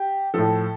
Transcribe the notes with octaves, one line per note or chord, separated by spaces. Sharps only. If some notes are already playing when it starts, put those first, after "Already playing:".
Already playing: G4
A2 F3 A4